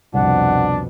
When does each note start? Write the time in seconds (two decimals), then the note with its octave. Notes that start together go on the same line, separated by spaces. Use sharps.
0.14 C2 F2 B2 D4 F#5